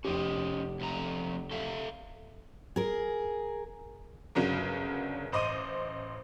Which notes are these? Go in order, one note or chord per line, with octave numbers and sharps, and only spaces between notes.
F1 C#4 G4 C5 D#5
F2 A3 A#5
A4 E5 F5
G#4 A#4
G1 C#3 F#3 D4 A#4
A1 C5 D#5 C6 D6 D#7